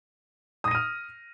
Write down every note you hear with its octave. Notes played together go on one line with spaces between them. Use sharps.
D#6 F6 A#6 D#7